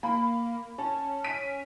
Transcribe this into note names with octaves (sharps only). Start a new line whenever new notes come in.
A#3 B5
C#4 A5
B6 D7 D#7